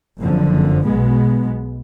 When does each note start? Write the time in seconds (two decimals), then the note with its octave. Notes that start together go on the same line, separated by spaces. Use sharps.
0.21 F#1 F2 D3 F3
0.84 B1 B2 G#3 B3